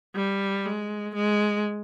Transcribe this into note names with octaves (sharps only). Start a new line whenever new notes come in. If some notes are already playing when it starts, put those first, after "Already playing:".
G3
G#3
G#3